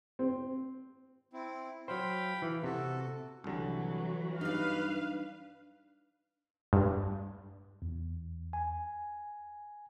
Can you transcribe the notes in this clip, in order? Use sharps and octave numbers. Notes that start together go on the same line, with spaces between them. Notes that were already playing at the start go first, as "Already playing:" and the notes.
C4
C4 E4
F#3 C5 F5 G5 B5
E3
C3 F#4 A4
C2 D3 E3 F#3
G2 D4 D#4 B4 F5
G2
E2
G#5